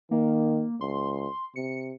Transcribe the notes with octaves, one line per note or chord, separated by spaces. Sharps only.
D#3 A#3
C#2 C6
C3 C#7